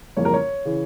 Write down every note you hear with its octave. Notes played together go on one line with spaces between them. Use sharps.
F2 C#3 E3 G3 A#3 C#5
A#4
C#5
C#3 E3